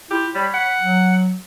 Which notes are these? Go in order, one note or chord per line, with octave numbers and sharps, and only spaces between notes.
E4 F4 G4
G3 C#5 B5
F#5
F#3